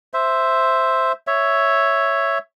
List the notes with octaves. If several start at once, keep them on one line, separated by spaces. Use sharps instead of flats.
C5 E5
C#5 E5